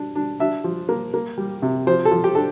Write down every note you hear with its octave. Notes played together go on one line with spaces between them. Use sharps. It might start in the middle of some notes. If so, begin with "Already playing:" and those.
Already playing: D4
D4
D4 E5
F3
A#3
A#3
G3
C3
F3 C5
A4
F3
G4
D4 A4